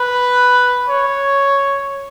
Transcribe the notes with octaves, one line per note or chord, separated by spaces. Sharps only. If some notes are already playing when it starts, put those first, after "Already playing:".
Already playing: B4
C#5